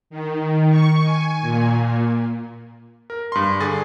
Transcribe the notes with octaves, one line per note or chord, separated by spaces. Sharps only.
D#3
C#6
G#5
A#2
A#4
G2 C6
D3 G#4 A6